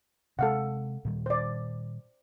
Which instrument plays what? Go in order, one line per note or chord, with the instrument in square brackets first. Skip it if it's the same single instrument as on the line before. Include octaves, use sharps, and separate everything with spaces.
[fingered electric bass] C3 G#3 [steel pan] A4 F5 F#5
[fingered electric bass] A#2 D#3 G3
[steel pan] C5 D5